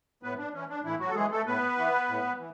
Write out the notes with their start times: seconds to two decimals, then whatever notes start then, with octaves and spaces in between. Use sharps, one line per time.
0.23 A2 B3 B4
0.38 D4
0.54 E3 C#4
0.70 D4
0.84 A2 E3 E4
1.00 F#3 F#4
1.09 A4
1.15 E3 G#3 G#4
1.31 A3 A4
1.46 A2 B3 B4
1.77 E3
2.09 A2
2.39 E3